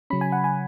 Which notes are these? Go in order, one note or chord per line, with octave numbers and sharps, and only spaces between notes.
C#3 F#3 C#4 B5
G#5
F#5
G#5